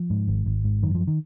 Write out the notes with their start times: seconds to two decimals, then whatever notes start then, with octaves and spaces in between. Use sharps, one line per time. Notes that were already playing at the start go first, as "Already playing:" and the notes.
Already playing: F3
0.10 G#2
0.28 G#1
0.46 G#1
0.64 G#2
0.83 F#2 D#3
0.95 F3
1.07 D#3